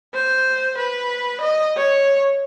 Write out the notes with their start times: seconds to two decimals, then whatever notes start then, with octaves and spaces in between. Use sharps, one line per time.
0.14 C5
0.78 B4
1.41 D#5
1.77 C#5